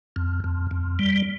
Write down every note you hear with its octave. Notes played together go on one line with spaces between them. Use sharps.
F2
F2
F2
G3